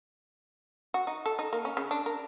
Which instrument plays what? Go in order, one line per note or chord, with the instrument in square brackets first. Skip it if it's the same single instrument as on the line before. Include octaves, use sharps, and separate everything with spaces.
[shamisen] F#4
D#4
A4
D#4
A#3
C#4
C#3
D4
A#4